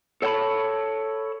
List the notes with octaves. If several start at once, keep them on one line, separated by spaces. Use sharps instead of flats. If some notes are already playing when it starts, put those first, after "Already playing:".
A4 C#5 F#5 G5 A5 B5